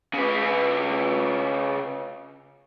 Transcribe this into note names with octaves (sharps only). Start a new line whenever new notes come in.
C#3 B4